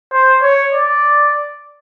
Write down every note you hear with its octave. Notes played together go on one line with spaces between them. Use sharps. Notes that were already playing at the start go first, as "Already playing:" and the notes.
C5
C#5
D5